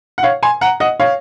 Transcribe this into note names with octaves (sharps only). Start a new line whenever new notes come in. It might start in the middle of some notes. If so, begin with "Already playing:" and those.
F#5
C#5 F5
G#5 C6
F#5 A#5
D#5 F#5
C#5 F5